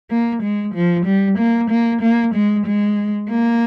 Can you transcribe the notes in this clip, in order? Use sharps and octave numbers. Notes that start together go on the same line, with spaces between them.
A#3
G#3
F3
G3
A#3
A#3
A#3
G#3
G#3
A#3